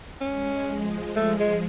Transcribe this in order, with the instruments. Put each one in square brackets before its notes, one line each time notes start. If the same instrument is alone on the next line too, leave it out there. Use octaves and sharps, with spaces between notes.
[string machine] G#3 [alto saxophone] C#4
[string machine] F3
[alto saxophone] A3
G#3